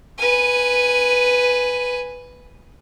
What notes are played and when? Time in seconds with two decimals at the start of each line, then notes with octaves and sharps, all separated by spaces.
0.18 B4 G#5